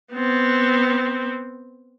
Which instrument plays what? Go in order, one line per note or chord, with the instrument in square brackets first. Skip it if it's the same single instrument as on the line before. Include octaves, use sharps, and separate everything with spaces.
[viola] B3 C4